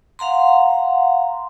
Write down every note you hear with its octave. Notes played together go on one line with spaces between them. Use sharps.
F5 F#5 A#5 C6